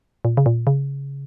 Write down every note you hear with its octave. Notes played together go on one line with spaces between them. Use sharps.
A#2
C#3
A#2
C#3